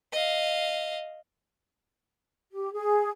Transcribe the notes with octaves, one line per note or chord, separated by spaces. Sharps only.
D#5 F5
G4
G#4